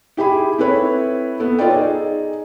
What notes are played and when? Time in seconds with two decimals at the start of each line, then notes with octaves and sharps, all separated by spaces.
0.17 E4 G4 G#4 B5
0.58 C4 E4 A4 B4 C#5
1.40 B3 A4
1.59 D#4 F4 A4 C#5 D5 G5
1.70 D#4 G#4